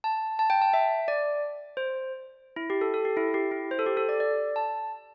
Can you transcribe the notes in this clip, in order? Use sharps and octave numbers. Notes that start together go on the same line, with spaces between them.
A5
A5
G5
A5
E5
D5
C5
E4
G4
A4
A4
G4
E4
G4
E4
C5
A4
G4
A4
D5
D5
A5